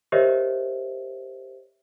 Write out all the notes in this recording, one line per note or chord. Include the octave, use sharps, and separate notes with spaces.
G4 A#4 C5 C#5 D#5 E5